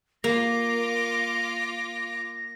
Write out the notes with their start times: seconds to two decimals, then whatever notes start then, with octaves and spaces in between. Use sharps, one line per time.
0.24 A#3 F4 D6 A#6